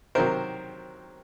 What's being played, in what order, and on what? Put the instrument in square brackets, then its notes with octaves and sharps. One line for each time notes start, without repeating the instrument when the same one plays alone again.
[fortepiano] C3 D#3 F#3 A#4 C5